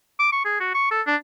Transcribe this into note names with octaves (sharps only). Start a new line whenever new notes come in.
D6
C#6
G#4
F#4
C#6
A4
D4